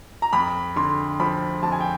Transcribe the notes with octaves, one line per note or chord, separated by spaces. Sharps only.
A#5
F2 B5
D3 C6
F3 B5
F2 A5
G#5
G5